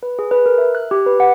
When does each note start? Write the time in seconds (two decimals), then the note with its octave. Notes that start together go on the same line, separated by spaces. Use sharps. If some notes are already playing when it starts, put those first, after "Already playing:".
0.03 B4
0.19 G#4
0.31 B4
0.46 A#4
0.58 E5
0.75 F#6
0.91 G4
1.06 B4
1.20 F#5